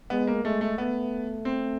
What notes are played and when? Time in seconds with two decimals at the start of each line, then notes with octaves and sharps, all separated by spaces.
0.10 G#3 B3
0.28 A#3
0.44 G#3 A3
0.61 A3
0.78 A3 B3
1.45 C4